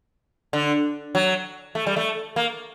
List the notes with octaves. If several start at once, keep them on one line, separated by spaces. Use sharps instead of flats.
D3
F#3
A3
G3
A3
A#3